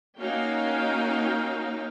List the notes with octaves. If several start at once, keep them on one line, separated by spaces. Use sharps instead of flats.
A#3 C#4 D#4 F#4 F5 G5